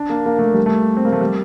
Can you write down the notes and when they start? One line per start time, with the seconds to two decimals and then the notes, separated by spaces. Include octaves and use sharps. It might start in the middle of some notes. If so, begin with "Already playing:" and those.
Already playing: D4
0.09 A#3
0.26 A#3
0.39 A3
0.54 G3
0.66 A3
0.97 C4
1.05 A#3
1.12 A3
1.21 G3